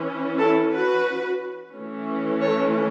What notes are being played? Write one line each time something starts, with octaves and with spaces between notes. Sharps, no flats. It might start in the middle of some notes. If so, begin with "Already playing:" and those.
Already playing: E3 C#4
E4 A4
F#4 B4
E3 A3 C#4
A4 C#5